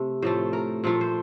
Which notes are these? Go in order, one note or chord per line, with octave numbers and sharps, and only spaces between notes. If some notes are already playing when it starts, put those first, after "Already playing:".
Already playing: C3 A3
A2 F3 A3 C5
A#4
A#2 F3 A3
C5